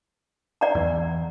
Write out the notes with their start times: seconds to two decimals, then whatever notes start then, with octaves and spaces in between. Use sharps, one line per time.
0.61 D5 F#5 A#5
0.75 E2 E3